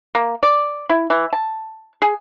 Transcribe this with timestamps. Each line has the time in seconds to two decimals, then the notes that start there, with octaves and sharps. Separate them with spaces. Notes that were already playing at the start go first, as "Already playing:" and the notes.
0.15 A#3
0.43 D5
0.89 E4
1.10 E3
1.33 A5
2.02 G#4